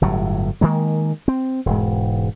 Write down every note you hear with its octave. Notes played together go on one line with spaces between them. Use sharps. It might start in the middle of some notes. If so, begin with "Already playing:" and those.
G1 A2 F#3
D#3 G#3 A#3
C4
E1 G#2